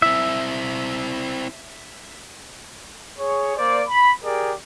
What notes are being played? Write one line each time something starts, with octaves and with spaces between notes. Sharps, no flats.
C4 E4 E5
G#4 C#5
A#3 C5 D5
B5
G4 G#4 A#4 D5